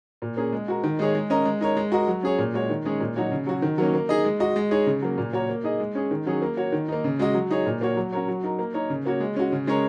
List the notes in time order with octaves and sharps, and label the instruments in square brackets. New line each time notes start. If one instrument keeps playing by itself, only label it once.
[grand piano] A#2
A#3 C#4 G#4
G#3
F#4 A#4
D#3
G#3 D#4 G#4 C#5
G#3
C#4 A#4 D#5
G#3
D#4 A#4 C#5
G#3
F#4 A#4 D#5
F#3
C#4 G#4 C#5
A#2
G#3 F#4 C#5
D#3
G#3 C#4 G#4 C#5
A#2
F#3 D#4 F#4 C#5
C#3
F#3 C#4 F#4
D#3
F#3 A#3 C#4
A#3
D#4 G#4 D#5
G#3
F#4 D#5
G#3
D#4 G#4 C#5
C#3
F#3 A#3
A#2
A#3 F#4 A#4 C#5
A#3
D#4 G#4 D#5
G#3
C#4 G#4
D#3
F#3 C#4 G#4
A#3
F#4 C#5
D#3
A#3 D#4
C#3
G#3 F#4 D#5
F#3
D#4 G#4 C#5
A#2
A#3 F#4 C#5
F#3
C#4 F#4 A#4 C#5
F#3
D#4 A#4
A#3
D#4 A#4 C#5
C#3
A#3 F#4 C#5
G#3
C#4 F#4
C#3
G#3 C#4 A#4 C#5